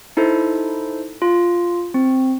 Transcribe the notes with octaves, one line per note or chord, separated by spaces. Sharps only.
D#4 E4 A4 C5
F4
C4